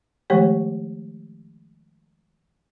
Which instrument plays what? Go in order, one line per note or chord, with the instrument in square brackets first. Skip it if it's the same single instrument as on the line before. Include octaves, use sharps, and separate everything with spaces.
[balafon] D#3 F3 G#3 A3 G4 C#5